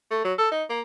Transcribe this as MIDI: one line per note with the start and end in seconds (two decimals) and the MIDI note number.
0.11 0.21 57
0.24 0.33 54
0.38 0.48 69
0.52 0.64 63
0.69 0.81 58